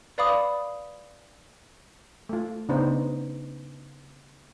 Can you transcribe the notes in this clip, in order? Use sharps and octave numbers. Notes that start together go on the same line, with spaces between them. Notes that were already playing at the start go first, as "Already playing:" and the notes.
B4 D5 F5 B5 D6 D#6
A3 F4
C#3 B3 D4 D#4 C5